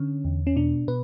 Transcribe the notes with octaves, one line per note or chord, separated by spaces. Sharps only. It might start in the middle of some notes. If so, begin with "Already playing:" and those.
Already playing: D3 C#4
E2
C#4
B2 D4
B2 B4